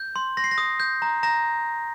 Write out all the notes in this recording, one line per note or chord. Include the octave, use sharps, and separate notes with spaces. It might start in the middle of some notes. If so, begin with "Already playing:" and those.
Already playing: G6
C6
C6 A#6
C7
A#6
D#6
G6
A#5
A#5 A#6